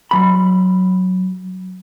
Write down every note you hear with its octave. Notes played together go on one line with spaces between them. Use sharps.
F#3 B5